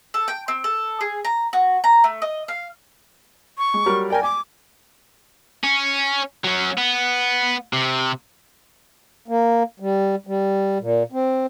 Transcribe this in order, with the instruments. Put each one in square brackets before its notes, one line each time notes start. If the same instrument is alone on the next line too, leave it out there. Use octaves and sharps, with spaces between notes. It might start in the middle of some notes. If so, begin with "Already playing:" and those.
[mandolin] A4
G5
C4
A4
G#4
A#5
F#4
A#5
A3
D#5
F5
[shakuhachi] C#6
[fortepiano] G#3
F#3 G3 A#4
[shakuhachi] A#4 [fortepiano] D5 G5 G#5
[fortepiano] G#5 [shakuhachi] D6
[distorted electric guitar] C#4
F#3 C#4
B3
C3
[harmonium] A#3
G3
G3
A#2
C4